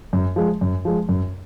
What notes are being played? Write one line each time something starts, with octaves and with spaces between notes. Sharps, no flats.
F#2
F3 G#3
F#2
F3 G#3
F#2